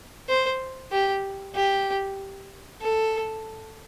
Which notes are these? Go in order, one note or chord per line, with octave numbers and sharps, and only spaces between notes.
C5
G4
G4
A4